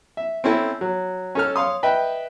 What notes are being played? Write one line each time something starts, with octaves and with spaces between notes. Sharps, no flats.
E5
C4 C#4 E4 A4
F#3
C#4 A4 F6
C#5 F5 C6 D#6
B4 D#5 E5 G5